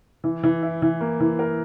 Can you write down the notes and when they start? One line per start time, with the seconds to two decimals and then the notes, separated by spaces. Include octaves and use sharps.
0.24 E3
0.43 E3
0.62 E4
0.82 E3
1.01 A#3
1.20 E3
1.39 A#4